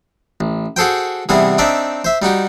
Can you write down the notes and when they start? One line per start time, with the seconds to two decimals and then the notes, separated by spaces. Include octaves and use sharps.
0.41 A1
0.76 F#4 G#4 A4 C5 G5
1.29 C3 E3 G3 B3 G#4
1.58 C4 D4 D#4 D5 E5
2.04 C5 E5
2.22 G3 D#4 F#4 G4